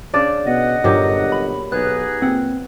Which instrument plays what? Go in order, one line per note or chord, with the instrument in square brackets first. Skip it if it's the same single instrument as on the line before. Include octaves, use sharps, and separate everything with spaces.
[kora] C#3 D4 D5
[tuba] B2 [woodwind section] D#5 F#5
[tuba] G1 [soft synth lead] G2 [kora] A#2 F#3 G4
[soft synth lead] B5
[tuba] B1 [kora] B3 [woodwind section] D#4 G4 G#4 [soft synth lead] F#6
[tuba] A#2 [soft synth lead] C4 [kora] F#5